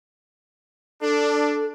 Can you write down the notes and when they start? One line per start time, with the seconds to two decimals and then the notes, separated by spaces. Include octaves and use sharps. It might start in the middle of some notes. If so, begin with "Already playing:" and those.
1.02 D4 A4